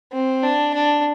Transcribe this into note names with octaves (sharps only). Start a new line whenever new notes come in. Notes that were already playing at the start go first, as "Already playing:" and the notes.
C4
D4
D4